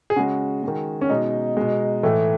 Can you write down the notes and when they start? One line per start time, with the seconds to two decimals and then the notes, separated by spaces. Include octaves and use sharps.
0.10 G#4
0.16 C#3 G#3 F#4
0.63 D#3 G#3
1.01 C#4
1.09 B2 G#3 D#4
1.57 B2 G#3
2.03 A2 E3 A3